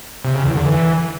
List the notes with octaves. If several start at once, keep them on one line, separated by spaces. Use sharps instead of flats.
C3
C#3
E2
D3
E3